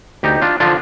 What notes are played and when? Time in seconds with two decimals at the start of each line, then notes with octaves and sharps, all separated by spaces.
0.23 D2 D#4 G4
0.42 D4 F4
0.60 D3 F3 D4 F4